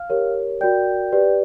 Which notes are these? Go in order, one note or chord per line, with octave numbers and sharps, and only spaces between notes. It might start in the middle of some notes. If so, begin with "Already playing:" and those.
Already playing: F5 F6
G4 A#4 C#5
F#4 A#4 D5 G5 G6
G4 B4 D5